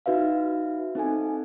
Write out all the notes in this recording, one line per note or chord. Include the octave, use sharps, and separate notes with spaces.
D#4 F#4 B4 E5 F5
C4 D#4 A4 G#5